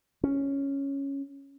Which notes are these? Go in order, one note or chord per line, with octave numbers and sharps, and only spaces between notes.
C#4